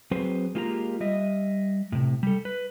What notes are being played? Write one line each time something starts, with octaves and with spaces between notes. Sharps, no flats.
F#3 C4 G#4 B4 C5
G#3 A#3 F4 G4 G#5 A#5
G3 D#5 E5
A2 C3
G3 A4
B4